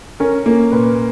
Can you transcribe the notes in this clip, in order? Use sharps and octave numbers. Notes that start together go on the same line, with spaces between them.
C#4 A#4
A#3
A#2 B4